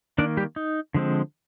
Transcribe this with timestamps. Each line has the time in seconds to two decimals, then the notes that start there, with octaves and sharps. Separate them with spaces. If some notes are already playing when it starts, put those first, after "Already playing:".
0.18 D#3 A#3 D4 D5
0.37 G3 G4
0.56 D#4
0.94 D3 F3 G#3 C4